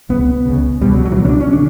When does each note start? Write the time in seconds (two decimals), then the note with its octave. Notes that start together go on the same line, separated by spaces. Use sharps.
0.09 C#2 C#3 B3
0.45 C#2 C#3
0.81 C#2 B2 G3
0.93 F#3
1.05 F#3
1.12 E3
1.16 C#2 B2 F#3
1.25 C#4
1.29 D4
1.40 C#4
1.53 D3 D4